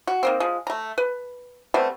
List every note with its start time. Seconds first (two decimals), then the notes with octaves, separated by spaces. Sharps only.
0.07 F#4
0.23 D#3 A#3 C4
0.40 F3 G#3
0.67 A3 A#5
0.98 B4
1.74 G3 A3 B3 C4